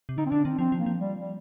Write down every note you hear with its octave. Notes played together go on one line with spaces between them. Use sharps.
C3
D3 D#4
C4
D3 D4
D#3 C4
F3 C4
F3
A#3
F3
G3
G3